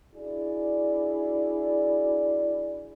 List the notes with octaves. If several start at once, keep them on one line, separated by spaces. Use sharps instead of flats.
D4 E4 F#4 G#4 D5